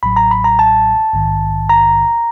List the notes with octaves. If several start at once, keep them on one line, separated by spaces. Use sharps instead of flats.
A1 A2 F#3 B5
A#5
B5
A#5
A5
A#1 G#2 D#3
A#5